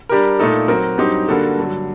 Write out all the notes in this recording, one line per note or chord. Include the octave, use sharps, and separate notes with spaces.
G3 D4 G4 A#4
A#2 A3 D#4 A4
F#3 C4 F#4 A#4
G2 F#3 C4 D#4 G4
D3 G3 A#3 F#4 A4
G2 D3 F#3